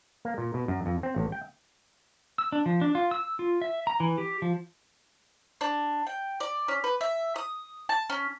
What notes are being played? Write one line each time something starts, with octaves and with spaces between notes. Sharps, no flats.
A#3
A#2
B2
F#2
F2
C4
A1
G5
E6
D4
F3
D4
F4
E6
F4
E5
A#5
E3
G4
F3
D4
G5
D5
C#4
B4
E5
D#6
A5
C#4